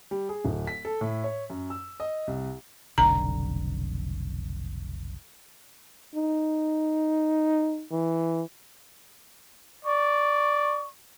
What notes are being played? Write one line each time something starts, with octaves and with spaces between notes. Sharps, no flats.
G3
G#4
D1
B6
A4
A2
C#5
F#2
E6
D#5
C2
F1 B1 D3 A#5
D#4
E3
D5 C#6